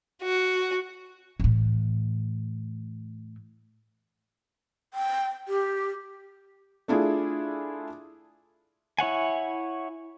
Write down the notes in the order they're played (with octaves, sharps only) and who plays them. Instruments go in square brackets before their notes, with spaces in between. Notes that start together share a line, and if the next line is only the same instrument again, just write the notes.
[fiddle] F#4
[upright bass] A2 E3
[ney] G5
G4
[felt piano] A3 D4 E4 F4 G#4
[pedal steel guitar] E4 C#5 F#5 G#5